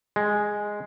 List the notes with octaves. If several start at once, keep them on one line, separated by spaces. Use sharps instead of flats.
G#3